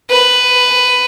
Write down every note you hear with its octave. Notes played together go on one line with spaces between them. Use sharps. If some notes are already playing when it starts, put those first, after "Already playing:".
B4